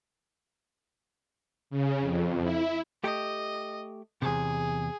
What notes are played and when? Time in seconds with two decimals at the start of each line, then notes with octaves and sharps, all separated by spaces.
1.70 C#3
2.01 F2
2.43 E4
3.04 A3 G4 D#5
4.22 E2 C3 G#4